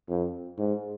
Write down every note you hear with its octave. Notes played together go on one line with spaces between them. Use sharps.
F2
G#2